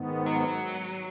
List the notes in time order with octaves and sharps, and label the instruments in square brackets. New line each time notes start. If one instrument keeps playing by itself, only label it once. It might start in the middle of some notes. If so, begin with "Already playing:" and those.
Already playing: [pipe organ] G#2 D#3 B3
[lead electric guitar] F#3